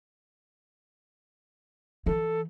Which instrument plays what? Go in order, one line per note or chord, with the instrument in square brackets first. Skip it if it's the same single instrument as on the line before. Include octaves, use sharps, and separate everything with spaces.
[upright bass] E3 [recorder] A4